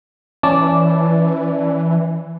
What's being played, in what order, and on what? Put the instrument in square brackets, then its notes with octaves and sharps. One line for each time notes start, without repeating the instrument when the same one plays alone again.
[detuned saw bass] E3 [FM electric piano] C#4 D5 A5